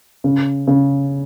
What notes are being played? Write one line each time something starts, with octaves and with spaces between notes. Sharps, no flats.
C#3
C#3